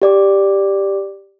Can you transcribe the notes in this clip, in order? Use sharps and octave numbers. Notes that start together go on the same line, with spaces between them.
G4 D5 D6